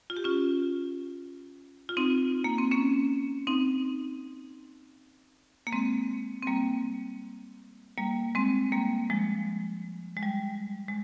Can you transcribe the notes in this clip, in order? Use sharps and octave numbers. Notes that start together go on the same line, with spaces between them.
F4
G4
C#4 F4
F4
C4 D#4
A#3
C4
A#3 C#4
C4 D#4
A#3
G#3 C4
C4
G3 A#3
G3 A#3
G#3 C4
G3 A#3
F3 G#3
G#3
G3
G#3